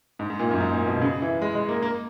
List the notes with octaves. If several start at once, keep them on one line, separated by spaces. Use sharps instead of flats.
G#2
G#2
A#2
F#2
G#2
A#2
B2
C#3
E3
G#3
G#3
A#3
A#3